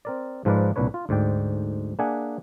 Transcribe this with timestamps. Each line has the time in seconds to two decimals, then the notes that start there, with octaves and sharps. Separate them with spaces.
0.05 C4 A#4 D5
0.45 G#2 F3 G#3 A#4 B4 D5
0.76 C2 A#2 D4 B4 C#5
0.94 F4
1.09 D2 G#2 D5 G5
1.99 A#3 D4 G#4 E5 F#5 G#5